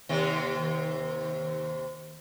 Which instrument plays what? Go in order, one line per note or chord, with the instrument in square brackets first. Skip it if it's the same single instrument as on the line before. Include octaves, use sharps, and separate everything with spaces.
[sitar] D#2 C3